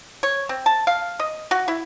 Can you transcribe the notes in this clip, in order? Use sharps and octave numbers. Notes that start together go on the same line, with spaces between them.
C#5
C4
A5
F5
D#5
F#4
E4